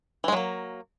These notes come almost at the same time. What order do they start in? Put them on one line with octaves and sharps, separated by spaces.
E3 G#3 F#3 A#3